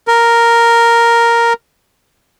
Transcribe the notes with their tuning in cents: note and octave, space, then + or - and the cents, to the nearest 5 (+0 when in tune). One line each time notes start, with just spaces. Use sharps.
A#4 +0